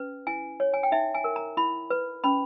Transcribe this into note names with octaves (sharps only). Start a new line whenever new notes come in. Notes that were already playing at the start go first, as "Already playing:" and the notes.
Already playing: C#4 B4
E4 G#5
C#5
G#5
G5
D#4 E5
G#5
A#4
A#5
E4 B5
B4
C#4 B5